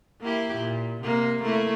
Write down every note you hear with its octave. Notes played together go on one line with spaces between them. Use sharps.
A#3 E4 G4
A#2
C3 A#3
A3 A#3 E4